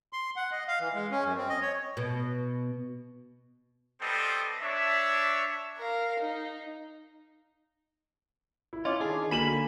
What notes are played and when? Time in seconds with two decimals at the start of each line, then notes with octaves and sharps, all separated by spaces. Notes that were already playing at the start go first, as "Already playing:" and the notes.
0.13 C6
0.36 F#5
0.52 D#5
0.68 F5
0.80 E3
0.94 G#3
1.11 C#4
1.24 F#2
1.37 C4
1.49 D#5
1.62 C#5
1.97 B2
4.01 G3 B3 C4 A4 C5 D#5
4.62 D4 C#5 E5
5.78 A#4 F5
6.20 D#4
8.73 E4
8.85 C#4 F4 D#5 D6
9.00 D#3 D4 G#4
9.31 D3 A#3 F#4 G#5 B5 E7 F#7